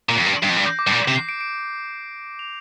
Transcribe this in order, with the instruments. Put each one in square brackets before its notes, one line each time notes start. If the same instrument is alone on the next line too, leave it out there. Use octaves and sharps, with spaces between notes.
[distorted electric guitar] A#2
[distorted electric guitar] F2 [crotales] C7
[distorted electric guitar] G2
[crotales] D7
[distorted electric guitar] G2 [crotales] C7
[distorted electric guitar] F2
[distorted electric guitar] G2 [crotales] A#6
[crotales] G6
D6
[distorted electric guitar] G2
A#2
C3
[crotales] C7
D7
D7
F7